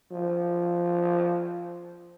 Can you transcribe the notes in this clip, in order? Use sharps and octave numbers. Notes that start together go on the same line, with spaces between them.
F3